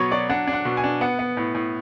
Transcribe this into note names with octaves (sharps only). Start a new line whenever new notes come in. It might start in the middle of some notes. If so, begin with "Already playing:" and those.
Already playing: B2 F#3 B3 B4 C#5
F#3 D5
D4 F#5
D4
F#5
B2
G#5
D4
B3 F#5
B3
A2
A2